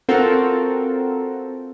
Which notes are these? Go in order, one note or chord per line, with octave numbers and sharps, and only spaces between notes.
C4 F4 F#4 A4 A#4